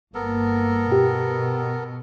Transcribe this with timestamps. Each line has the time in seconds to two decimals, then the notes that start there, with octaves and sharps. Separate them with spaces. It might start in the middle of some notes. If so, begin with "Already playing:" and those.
0.15 G1 A#3 B3 A4 A#4
0.91 B2 G4